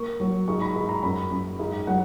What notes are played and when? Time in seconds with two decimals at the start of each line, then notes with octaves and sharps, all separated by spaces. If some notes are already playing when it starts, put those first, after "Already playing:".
Already playing: A#3 C#6
0.20 F#3
0.48 G#2 C#6
0.61 B5
0.75 G#2 B5
0.89 A#5
1.03 F#2 B5
1.31 F#2
1.59 G#2
1.87 F#3 F#5